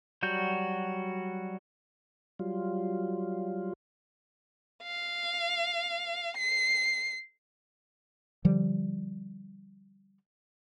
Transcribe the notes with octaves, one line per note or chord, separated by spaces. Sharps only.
F#3 G3 F#4 G6
F#3 G3 F4
F5
C7
D3 F3 G3